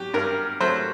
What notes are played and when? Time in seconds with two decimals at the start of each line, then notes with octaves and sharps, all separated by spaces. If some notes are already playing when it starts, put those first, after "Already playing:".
Already playing: F#3 G4
0.14 G2 A#4
0.60 F#3 A3 C5